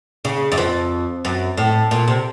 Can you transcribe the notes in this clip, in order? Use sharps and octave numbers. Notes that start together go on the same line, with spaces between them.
C#3
F#2
F2
F#2
A2
A#2
C3